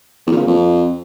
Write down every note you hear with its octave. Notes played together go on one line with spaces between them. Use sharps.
E2
A#2
C#3
A#2
F2